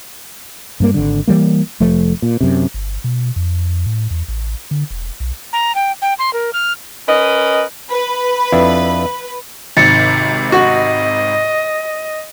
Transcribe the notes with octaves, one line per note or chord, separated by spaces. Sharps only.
G2 G3 A#3
G#1 D3
E3 G3 A#3
F1 F3 A3
A#2
F#2 C3
G1
B2
F2
A2
E2
A1
D3
E1
B1
A#5
G5
G5
C6
A#4
F6
C#4 A#4 B4 D#5
B4
F2 D4 E4
G#1 C3 D#3 A6 C#7
F#4 D#5